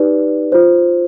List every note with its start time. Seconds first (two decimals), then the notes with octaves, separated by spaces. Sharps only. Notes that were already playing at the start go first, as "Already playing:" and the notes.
Already playing: D#4 G4 B4 D5
0.52 F4 C5